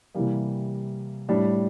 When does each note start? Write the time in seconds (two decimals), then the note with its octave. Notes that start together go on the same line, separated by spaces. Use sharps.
0.14 C3 E3 G3 A#3
1.29 A2 G3 D4